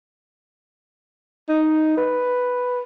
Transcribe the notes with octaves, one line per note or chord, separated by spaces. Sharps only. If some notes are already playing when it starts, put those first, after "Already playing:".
D#4
B4